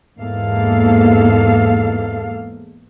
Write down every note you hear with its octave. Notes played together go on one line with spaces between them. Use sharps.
E2 G#2 A#3 A4 F5